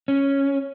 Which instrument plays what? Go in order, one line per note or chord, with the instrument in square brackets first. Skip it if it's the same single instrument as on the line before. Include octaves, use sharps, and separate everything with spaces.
[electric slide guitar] C#4